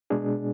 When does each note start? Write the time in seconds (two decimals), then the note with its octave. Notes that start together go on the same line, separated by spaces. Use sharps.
0.10 B2 G#3 D4 G#4